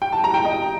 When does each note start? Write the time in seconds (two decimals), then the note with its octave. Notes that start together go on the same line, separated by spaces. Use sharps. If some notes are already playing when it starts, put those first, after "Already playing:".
0.02 G5
0.12 A5
0.24 A#5
0.34 G5
0.45 D#5